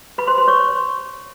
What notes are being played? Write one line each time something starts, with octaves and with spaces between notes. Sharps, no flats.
B4 B5
C5 C6
C5 C6
C#5 C#6